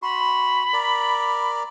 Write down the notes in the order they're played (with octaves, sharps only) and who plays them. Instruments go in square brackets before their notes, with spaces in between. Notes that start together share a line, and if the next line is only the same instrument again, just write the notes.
[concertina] F#4 C6 [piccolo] B5
[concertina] A#4 D5